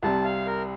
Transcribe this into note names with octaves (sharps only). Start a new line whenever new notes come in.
C2 C3 G3 A5
F5
A#4